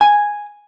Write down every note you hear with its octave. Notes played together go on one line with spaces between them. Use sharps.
G#5